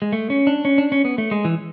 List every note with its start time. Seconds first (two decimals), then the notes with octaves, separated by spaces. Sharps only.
0.02 G#3
0.13 A3
0.30 C#4
0.47 D4
0.65 C#4
0.78 D4
0.92 C#4
1.05 B3
1.18 A3
1.31 G#3
1.45 E3